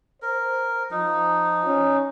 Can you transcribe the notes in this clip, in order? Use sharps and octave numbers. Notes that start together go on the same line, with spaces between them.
A#4 C5
F3 D#4
C#4